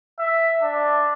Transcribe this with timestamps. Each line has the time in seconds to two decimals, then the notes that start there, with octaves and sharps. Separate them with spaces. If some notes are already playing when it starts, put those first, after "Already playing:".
0.19 E5
0.62 D4